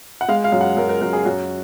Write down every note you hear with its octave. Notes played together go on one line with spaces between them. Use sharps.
F#5
G#3 F5
F5
F#2
F#5
F#2 A#4
A#4
F#2 A#4
G#4
F#2 F#4